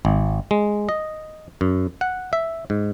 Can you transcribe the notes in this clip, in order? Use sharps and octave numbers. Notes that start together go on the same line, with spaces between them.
G#1
G#3
D#5
F#2
F#5
E5
G#2